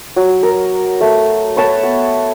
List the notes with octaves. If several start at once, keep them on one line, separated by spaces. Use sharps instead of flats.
F#3
A#4
A3
B4 C#5 G5 A5
B3